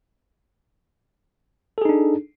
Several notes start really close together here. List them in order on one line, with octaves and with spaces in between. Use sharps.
A4 G#4 D#4 D4